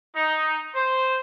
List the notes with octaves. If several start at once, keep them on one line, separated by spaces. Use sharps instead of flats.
D#4
C5